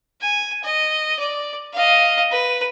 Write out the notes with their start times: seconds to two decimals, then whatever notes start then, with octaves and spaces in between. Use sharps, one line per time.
0.21 G#5
0.63 D#5
1.19 D5
1.73 D#5 F5
2.31 B4